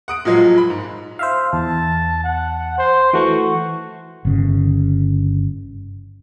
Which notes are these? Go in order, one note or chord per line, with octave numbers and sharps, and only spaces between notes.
F#5 D#6 D7
A#2 F3 F#3 G#3
B5
G#2
C5 E5 F5
E2 A5
F#5
C5
E3 A3 F#4 C#6
G1 C#3